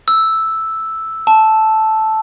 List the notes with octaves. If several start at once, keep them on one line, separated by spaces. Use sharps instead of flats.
E6
A5